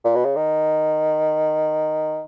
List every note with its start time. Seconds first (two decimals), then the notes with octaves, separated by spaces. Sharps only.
0.04 A#2
0.15 B2
0.25 C#3
0.36 D#3